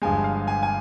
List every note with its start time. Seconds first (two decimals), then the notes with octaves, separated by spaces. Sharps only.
0.02 G1 G2 F3 G#3 G#5
0.24 F5
0.48 G#5
0.63 G#5